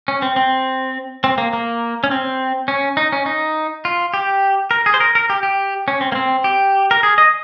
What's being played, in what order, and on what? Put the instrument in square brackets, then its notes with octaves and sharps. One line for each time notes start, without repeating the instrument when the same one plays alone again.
[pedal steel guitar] C#4
C4
C4
C4
A#3
A#3
C#4
C4
C#4
D#4
C#4
D#4
F4
G4
A#4
G#4
C5
A#4
A#4
G4
G4
C#4
C4
A#3
C4
G4
A#4
G#4
D#5